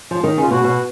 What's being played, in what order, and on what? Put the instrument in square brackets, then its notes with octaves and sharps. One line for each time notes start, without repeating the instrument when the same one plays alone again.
[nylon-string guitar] F3
D#3
C#3
[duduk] F4
[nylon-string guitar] B2 [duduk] F#4
[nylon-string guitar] B2